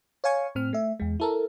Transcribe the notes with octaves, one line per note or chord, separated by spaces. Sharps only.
C#5 F5 G#5 C#6
A2 C4 F6
A3 E5
E2 G#3
E4 A4 A#4